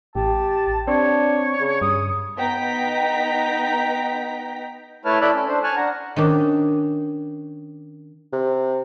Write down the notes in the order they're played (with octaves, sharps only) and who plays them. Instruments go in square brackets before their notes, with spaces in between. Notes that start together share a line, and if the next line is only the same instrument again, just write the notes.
[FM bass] A1 [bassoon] G4 [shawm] A5
[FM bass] C4 [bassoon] D4 [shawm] C#5
[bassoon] C#3
[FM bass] G2 [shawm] D#6
[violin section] B3 D#4 G5 A#5 B6
[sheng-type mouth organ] A3 E4 B4 C#5 A5 F6
E4 A4 D5 B5 F#6
C#4 A4
D4 C5
G#5 A5 C#6 F6 F#6
D4 F#5 A#5
[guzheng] D#3 C#4 D4
[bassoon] C3